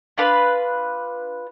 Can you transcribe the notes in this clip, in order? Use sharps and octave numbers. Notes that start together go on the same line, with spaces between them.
D4 F4 B4